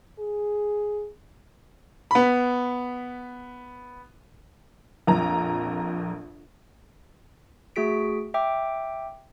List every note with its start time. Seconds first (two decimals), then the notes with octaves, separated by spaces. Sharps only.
0.19 G#4
2.11 B3 B5
5.07 A#1 F2 A#5
7.76 A3 F#4 G#4 B6 D7
8.34 E5 G5 D6